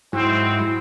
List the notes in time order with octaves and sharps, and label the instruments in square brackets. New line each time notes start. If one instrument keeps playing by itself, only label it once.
[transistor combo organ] G#2 F#3 [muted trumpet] C4 [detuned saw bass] E4